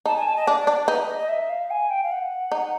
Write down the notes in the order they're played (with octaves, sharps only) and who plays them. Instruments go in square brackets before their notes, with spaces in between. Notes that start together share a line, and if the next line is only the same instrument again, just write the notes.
[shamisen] D#4 [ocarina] A5
[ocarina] G#5
A5
D#5
[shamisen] D4 [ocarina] D5
[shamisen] D4 [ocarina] D5
[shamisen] D#4 [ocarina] B4
[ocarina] D#5
D#5
E5
F5
G#5
G5
F5
F#5
[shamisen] D#4